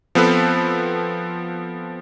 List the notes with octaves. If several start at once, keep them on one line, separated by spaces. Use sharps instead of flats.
F3 B3 C4 A4 B4